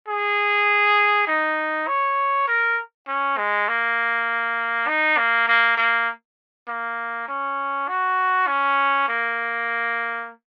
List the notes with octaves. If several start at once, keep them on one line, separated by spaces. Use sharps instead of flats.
G#4
D#4
C#5
A#4
C#4
G#3
A#3
D#4
A#3
A#3
A#3
A#3
C#4
F#4
C#4
A#3